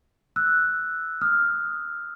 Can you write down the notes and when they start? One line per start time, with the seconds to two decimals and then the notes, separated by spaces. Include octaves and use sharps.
0.36 E6 F#6
1.21 D#6 F6